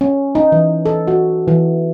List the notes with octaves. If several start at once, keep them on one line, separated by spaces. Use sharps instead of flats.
C#4
D#4
E3
A4
F#4
E3